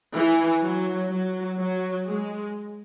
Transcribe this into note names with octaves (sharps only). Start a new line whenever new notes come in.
E3
F#3
F#3
F#3
G#3